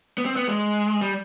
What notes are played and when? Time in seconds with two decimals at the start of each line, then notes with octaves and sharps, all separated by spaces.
0.18 B3
0.26 C4
0.36 B3
0.48 G#3
1.02 G3